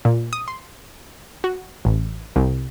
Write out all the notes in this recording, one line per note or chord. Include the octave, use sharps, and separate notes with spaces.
A#2
D#6
C6
F#4
A1
C2